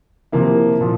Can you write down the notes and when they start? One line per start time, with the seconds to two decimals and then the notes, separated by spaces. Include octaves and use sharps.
0.32 C3 F3 A#3 E4
0.81 A#2 F3